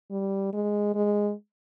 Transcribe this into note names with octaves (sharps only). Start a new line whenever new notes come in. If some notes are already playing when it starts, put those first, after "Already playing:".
G3
G#3
G#3